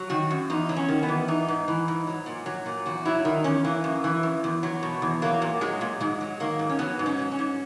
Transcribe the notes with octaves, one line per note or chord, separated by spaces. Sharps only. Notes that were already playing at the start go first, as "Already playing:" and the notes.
Already playing: F#3
D#3 F#4
F#2
E2 D#4
F#3
C#4
D#3
B3
E2
E3 D#4
G#2
E3
G#2
F#3
A#2
F#3
A#2
E2 F#4
F#3 E4
D#3 D#4
E2 C#4
E3 A#3
F#2
E3
F#2
E2
F#3
B2
E2
F#3 A#3
A#2
F#3 G#3
A#2
G#2 G#3
F#3
D#3 A#3
G#2
C#4
F#3 B3
G#2
C#4
F#3
C#4
G#2